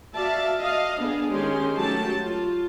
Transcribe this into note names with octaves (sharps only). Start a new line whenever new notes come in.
F#4 D5 E5 F5 A5
D#5 F5
B3 D4 G#4
D#3 G#3 C#4 G4 G#4 C6
F#3 A3 F#4 G4 A4 A5
F4